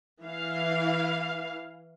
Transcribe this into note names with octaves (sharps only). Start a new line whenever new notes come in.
E3 F5